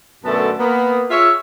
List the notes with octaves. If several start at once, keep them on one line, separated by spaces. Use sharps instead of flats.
F#2 B2 D3 A3 B3 A5
A#3 B3
F4 G#4 C#5 E5